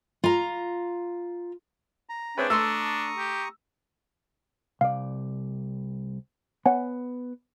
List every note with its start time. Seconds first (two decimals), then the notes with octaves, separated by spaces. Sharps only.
0.24 F4 A#5
2.09 A#5
2.38 C4 D4 G#4 B4 C#5 E5 G5
2.50 A3 A4 A#5 C6 C#6 D#6 E6
3.17 G4
4.81 C2 D5 F5
6.66 B3 C#5 F#5 G#5